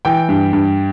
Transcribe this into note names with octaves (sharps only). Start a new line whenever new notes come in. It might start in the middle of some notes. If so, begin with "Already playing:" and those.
E3 G5
G2
G2